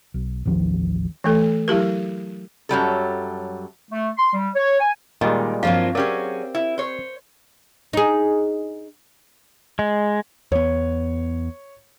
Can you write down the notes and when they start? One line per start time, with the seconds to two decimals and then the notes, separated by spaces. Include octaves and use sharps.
0.14 B1
0.45 A1 D#2 D#3 F3
1.24 E3 A3 A4
1.68 F#3 E4 G4 A#4
2.69 F#2 F#3 G3 A4
3.91 A3
4.17 C6
4.34 G3
4.55 C#5
4.80 G#5
5.21 A#2 D#3 G3 G#3 D#5
5.63 G2 F3 F#3 A#3 C4 F4 F5
5.95 F#3 C4 C#4 G4 G#4 A#4 D5
6.55 E4
6.78 C5 C#5
7.93 D#4 G#4
9.79 G#3
10.52 E2 B3 C#5